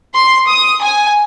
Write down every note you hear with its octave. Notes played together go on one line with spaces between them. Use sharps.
C6
D#6
G#5